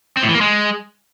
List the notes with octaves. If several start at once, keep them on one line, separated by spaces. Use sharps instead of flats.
C4
A2
E3
A#3
G#3